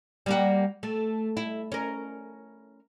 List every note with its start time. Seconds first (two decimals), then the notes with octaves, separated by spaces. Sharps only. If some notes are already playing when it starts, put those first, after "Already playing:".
0.26 G3 A#3 F#4
0.83 A3
1.37 E4
1.72 C#4 A#4